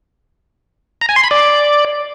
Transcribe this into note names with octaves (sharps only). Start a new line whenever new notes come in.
A#5
G#5
C6
B5
D5